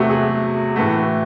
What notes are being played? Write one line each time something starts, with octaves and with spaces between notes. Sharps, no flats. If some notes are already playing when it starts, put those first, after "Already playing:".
Already playing: E2 C3 F#3 A3 F#4
G#4
A2 E3 A3 F#4